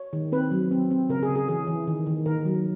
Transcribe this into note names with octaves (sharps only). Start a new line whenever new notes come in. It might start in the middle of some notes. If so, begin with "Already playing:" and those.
Already playing: C#5
D#3
C4 B4
F#3
C4
C4
C#3 A#4
G#4
C#3
G#4
E3 G#4
E3
D#3
D#3
D#3 A#4
F#3